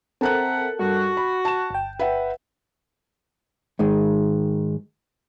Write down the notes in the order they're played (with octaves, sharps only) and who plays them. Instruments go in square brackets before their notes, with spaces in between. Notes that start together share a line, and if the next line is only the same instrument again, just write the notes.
[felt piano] C4 A#5 F#6 [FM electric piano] A4 A#4 A5 [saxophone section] E5 F#5
[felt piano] G2 [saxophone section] F#4
[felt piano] B5
A5 E7
[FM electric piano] G1 G5
[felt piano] B4 E5 F#5
[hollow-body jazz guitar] G#2 D#3 G#3